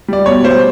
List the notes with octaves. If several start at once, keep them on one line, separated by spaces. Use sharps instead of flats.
G3 D5
B2 C#5
G3 C5